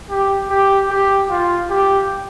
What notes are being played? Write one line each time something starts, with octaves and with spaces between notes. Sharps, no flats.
G4
G4
G4
F4
G4